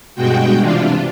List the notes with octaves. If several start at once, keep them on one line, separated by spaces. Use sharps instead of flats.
G2 B2 G#3 F#4 G5
C3 E3 D4 F4